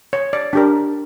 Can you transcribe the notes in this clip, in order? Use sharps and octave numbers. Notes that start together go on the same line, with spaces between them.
C#5
D5
D4 G4 A#4